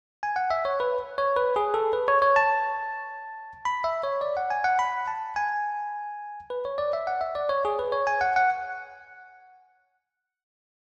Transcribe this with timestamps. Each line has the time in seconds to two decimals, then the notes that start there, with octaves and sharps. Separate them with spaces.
0.23 G#5
0.36 F#5
0.50 E5
0.65 C#5
0.80 B4
1.18 C#5
1.36 B4
1.56 G#4
1.74 A4
1.93 B4
2.08 C#5
2.22 C#5
2.36 A5
3.65 B5
3.84 E5
4.03 C#5
4.21 D5
4.37 F#5
4.50 G#5
4.64 F#5
4.79 B5
5.07 A5
5.36 G#5
6.50 B4
6.65 C#5
6.78 D5
6.93 E5
7.07 F#5
7.21 E5
7.35 D5
7.49 C#5
7.65 G#4
7.79 B4
7.92 C#5
8.07 G#5
8.21 F#5
8.36 F#5